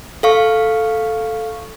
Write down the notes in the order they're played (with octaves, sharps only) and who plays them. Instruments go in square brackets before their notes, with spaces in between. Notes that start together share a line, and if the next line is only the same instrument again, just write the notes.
[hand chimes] A4 F5 C#6